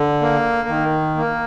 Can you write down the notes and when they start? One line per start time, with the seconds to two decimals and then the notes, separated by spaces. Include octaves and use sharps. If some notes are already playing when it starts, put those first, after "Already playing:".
Already playing: D3
0.21 A#3
0.68 D#3
1.16 A#3